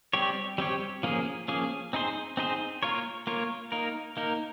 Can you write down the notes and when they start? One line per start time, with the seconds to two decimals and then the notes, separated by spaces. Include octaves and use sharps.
0.13 G3 C4 G4 C#5
0.58 G3 C4 G4 C#5
1.03 F3 A#3 C#4 G#4
1.48 F3 A#3 C#4 G#4
1.93 C4 D#4 G#4 C5
2.37 C4 D#4 G#4 C5
2.83 A#3 F4 A#4 C#5
3.27 A#3 F4 A#4 C#5
3.72 A#3 D#4 A#4
4.17 A#3 D#4 A#4